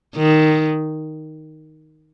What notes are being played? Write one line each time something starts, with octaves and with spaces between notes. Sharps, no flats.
D#3